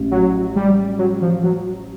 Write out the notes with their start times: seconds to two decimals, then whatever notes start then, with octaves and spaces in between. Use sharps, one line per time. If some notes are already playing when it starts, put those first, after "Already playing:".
Already playing: A1
0.11 F#3
0.56 G3
0.99 F#3
1.22 F3
1.43 F#3